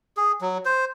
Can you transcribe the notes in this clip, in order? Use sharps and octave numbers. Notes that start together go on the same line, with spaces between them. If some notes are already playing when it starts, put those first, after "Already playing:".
G#4
F#3
C5